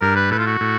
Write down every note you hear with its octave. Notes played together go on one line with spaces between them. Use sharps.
G2 A#4
B4
A2 B4
F4
F#4
A2